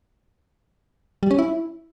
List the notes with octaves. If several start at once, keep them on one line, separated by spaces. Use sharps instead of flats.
G3
C#4
E4